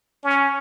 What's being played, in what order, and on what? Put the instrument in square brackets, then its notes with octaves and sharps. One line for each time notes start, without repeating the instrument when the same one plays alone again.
[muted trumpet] C#4